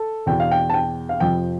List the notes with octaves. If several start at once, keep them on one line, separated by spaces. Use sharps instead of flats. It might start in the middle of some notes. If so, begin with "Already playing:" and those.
Already playing: A4
E2 B2 G5
F5
G5
A5
G5
F5
F2 C3 F3 G5